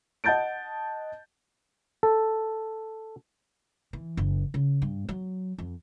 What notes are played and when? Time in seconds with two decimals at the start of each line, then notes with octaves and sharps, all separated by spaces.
0.24 D#5 F#5 A5 G6 A6 D7
2.03 A4
3.93 E3
4.17 F#1
4.54 C#3
4.82 G2
5.09 F#3
5.58 F2